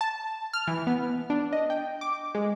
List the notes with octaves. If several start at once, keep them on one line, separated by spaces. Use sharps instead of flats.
A5
F6
E3
B3
D4
D#5
G5
D6
G#3